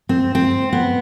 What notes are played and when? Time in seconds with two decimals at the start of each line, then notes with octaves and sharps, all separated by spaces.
0.09 C4
0.35 C4
0.73 B3